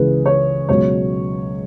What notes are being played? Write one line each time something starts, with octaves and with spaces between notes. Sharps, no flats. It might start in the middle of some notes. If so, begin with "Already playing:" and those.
Already playing: C#2 C#3 E3 G#4 B4
C#5
C#2 B2 F#3 C#5